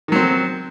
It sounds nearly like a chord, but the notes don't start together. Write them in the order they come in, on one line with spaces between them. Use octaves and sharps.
D#3 F#3 C4